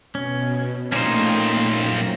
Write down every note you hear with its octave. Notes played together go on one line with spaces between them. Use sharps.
B2 C#4
A#2 A3 A#3 C#4 D#4 C5 G5
F#2 A#6